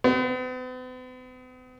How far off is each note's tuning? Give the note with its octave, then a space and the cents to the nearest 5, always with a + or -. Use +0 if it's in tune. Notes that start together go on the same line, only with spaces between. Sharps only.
B3 +45